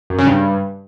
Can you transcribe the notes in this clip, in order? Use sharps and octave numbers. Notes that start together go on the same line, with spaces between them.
F#2
C#3
G2